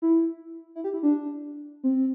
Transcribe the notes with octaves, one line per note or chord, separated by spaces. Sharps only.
E4
E4
G4
E4
D4
C4